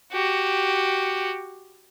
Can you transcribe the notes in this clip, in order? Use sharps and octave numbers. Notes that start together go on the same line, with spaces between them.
F#4 G4